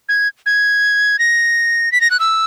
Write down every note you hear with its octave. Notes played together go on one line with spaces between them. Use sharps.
G#6
G#6
A#6
B6
A#6
F#6
E6